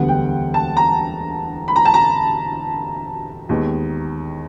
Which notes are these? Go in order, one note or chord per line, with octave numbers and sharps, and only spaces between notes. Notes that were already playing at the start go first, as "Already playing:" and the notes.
Already playing: E1 D2 D3 G3 B3 F#5
G5
A5
A#5
B5
A#5
A5
A#5
D#2 D#3 G#3 B3